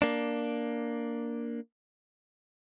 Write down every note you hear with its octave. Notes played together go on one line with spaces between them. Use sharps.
A#3 D4